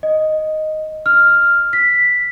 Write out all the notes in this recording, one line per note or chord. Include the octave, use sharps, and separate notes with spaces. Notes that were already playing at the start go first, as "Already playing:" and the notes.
D#5
F6
B6